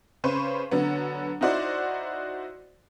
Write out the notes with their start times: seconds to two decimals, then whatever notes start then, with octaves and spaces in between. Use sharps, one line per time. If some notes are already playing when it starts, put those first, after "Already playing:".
0.24 C#3 B4 C5 C#6
0.71 D3 F#3 B3
1.41 D#4 E4 F#4 C5 D5